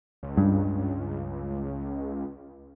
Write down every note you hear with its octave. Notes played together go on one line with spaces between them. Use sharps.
C#2
G2